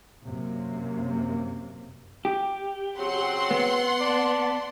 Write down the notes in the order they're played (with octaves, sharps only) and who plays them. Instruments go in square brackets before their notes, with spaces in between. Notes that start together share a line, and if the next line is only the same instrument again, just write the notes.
[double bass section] F#2 C3 A#3
[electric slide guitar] G4
[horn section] C#3 F#3 C4 [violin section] F#5 C6
[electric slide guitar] B3
[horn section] D5 A5